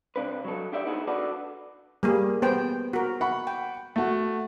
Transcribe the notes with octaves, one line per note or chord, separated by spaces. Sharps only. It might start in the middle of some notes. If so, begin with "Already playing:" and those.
C3 D4 B4
F#3 A4
D4 G4 D5 E5
B3 D#4 E4 G#4
D4 F#4 A4 B4 D5
G3 A#3 G#4
B3 C5 G5
F#4 A#4
F#5 B5 C#6
G5
A3 F#4